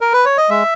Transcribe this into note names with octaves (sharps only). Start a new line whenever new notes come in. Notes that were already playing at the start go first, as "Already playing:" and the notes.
A#4
B4
C#5
D#5
G#3 E5